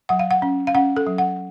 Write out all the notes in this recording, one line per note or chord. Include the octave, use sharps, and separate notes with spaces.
F#3 F#5
F5
F#5
C#4
F5
C#4 F#5
A4
F#3
F#5